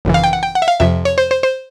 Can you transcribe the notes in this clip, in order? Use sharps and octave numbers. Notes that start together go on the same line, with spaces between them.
G#1 F#2 C#3 E3
F5
G5
F#5
G5
F#5
E5
F5
F2 C3 F3 E5
C#5
C5
C5
C5